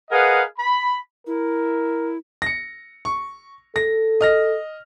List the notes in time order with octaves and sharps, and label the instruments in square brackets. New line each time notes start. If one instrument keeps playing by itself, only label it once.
[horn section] G#4 A#4 B4 D#5 F5 F#5
B5
[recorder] E4 [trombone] A#4
[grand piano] A#6 C#7
C#6
[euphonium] A4 [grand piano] A#6
[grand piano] D#5 F6 A#6